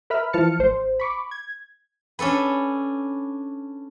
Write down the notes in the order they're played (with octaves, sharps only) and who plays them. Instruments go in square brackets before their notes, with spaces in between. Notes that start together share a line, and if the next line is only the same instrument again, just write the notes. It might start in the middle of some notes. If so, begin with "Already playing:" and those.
[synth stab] A#4 B4 E5 B5 F6
E3 F3 A5 F6 C#7
A1 C5
B5 C#6 D6
G#6
[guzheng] C#4 D4 A4 B4